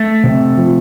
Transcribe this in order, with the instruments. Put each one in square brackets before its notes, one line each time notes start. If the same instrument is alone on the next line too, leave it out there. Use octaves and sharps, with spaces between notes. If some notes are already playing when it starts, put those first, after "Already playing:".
Already playing: [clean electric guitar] A3
[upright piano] C3
F3